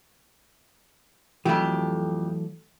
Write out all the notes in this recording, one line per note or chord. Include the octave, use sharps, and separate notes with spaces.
F2 E3 F#3 A3 G4